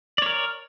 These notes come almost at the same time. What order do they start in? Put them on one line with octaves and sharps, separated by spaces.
D5 C#5 A#4